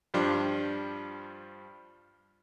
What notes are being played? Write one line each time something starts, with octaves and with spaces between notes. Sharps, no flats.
G2 F3 G3 D4